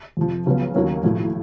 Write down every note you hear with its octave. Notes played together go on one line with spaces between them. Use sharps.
F2 C3 F3
C#2 C#3 F#3 B3
D#2 D#3 F#3 A#3 C#4
B1 A2 F3